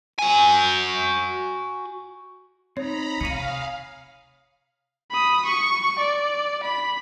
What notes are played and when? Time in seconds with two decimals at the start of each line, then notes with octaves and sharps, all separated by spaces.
0.19 F#4 G#5
2.77 C4 D#4 C#5 A#5 B5
3.21 C3 G#4 F5 C#6 C#7 D#7
5.11 B5 D#6
5.46 C#6
5.99 D5
6.64 B5